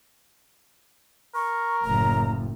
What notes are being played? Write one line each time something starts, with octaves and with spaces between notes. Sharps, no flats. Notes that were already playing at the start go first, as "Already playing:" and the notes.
A#4 C#6
F#1 A2 A#5